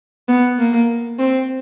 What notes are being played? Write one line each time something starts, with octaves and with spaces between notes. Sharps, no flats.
B3
A#3
C4